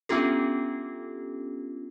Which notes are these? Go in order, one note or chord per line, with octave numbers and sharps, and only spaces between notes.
B3 C#4 D4 F4 G4 A4